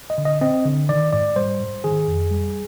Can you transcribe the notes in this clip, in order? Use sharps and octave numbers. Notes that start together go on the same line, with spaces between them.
D#5
D3
D#5
C4 D#5
D3
D#3 D5
G#2 D5
G3 C5
G#2
D#3 G#4
F2
G3